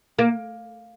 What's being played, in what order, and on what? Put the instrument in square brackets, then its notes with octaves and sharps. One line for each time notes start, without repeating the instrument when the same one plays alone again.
[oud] A#3